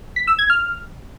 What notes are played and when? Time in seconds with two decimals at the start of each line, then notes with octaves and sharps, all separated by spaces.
0.16 B6
0.27 E6
0.39 G#6
0.50 F6